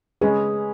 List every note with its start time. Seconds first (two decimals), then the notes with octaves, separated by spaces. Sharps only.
0.21 C#3 G#3 C#4 G#4 B4